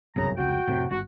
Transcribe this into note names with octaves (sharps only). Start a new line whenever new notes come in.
G1 C2 F#2 C#3 A#5
F1 C#2 F#4 G5
F1 A2 C3
G1 F#4